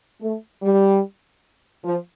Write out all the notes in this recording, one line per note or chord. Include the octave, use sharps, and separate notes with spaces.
A3
G3
F3